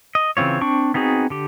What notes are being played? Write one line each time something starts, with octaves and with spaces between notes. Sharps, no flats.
D#5
C#3 E3 C4 F4 C#5
C4 D4 C#6
B3 C4 D#4 F#4 G#4
D3 G4